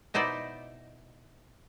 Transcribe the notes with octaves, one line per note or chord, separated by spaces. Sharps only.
B2 D#4 E4 C5 D5